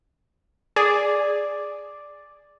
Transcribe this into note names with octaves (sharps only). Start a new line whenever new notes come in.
G#4 D5